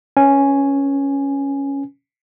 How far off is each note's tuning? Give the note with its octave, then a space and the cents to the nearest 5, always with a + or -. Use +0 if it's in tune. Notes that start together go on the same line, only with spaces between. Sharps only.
C#4 +0 B4 -25 G#5 +0